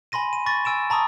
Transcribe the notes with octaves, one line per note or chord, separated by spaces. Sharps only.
G#5 B5 C6 A#6 D#7
D#7
B5 C#6 A6 A#6
G#5 E6 D7 E7
A5 A#5 C#6 D#6 E6